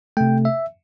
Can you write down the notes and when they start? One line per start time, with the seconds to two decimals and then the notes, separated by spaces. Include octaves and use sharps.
0.17 C3 A3 G5
0.45 E5